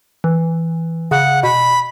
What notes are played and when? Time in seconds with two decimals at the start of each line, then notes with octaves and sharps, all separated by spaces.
0.24 E3
1.11 C#3 F#5
1.43 B2 B5